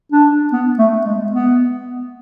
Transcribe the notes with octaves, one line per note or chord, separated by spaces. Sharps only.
D4
B3
A3
G#3
B3